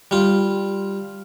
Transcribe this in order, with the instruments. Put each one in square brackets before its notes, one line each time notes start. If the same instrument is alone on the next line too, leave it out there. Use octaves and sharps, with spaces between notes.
[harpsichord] G3 F4